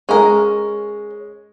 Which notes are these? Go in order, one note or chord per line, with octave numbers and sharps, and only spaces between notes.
G#3 C#4 A#4